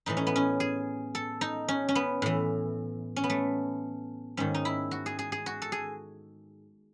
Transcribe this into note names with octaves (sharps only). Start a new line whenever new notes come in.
A2 E3 D#4
C#4
B3
C#4
G#4
A4
D#4
C#4
C#4
B3
A2 E3
C#4
B3
A3
G#2 D#3 C#4
D#4
E4
F#4
G#4
G#4
G#4
F#4
A4
G#4